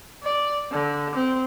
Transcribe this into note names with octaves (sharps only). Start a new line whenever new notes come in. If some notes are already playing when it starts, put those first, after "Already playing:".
D5
D3
C4